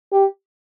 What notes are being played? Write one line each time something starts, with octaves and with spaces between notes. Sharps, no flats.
G4